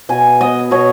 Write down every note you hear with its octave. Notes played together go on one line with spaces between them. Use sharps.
B2 G#5
B3 D#5
B2 C#5